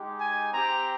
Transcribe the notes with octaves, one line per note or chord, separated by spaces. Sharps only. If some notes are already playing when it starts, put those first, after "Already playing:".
Already playing: G#3 D#4 G4
G#5
C4 G4 A#5